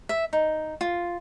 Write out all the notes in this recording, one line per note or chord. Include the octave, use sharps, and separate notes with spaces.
E5
D#4
F4